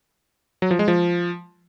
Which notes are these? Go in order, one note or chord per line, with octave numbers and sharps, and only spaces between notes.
F#3
F3
G#3
F3